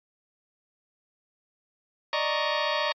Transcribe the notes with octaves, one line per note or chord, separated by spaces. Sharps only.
D5 D#5 A#5 C#6